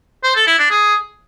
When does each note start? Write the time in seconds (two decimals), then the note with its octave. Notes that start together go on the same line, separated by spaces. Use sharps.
0.24 C5
0.35 A4
0.47 E4
0.59 D4
0.70 G#4